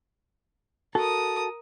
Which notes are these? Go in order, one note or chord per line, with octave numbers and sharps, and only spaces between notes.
F#4 A4 A#4 D#6